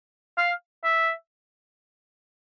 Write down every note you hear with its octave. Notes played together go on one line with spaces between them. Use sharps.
F5
E5